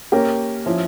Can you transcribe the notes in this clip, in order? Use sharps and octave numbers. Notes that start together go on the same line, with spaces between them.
A#3 C#4 G4 A#4
F3 C#4 E4